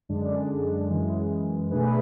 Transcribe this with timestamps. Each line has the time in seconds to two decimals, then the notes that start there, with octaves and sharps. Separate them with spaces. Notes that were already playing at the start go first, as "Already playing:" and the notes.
0.09 F#2 D3 G#3 D4
0.90 F#2 E3 G#3
1.71 B2 A3 D4 G#4 B4